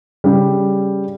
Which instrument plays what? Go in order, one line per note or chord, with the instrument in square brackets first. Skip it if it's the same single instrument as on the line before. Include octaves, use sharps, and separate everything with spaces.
[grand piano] C#3 G3